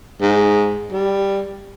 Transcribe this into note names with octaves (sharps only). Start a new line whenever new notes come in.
G#2
G3